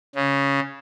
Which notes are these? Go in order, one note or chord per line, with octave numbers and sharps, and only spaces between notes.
C#3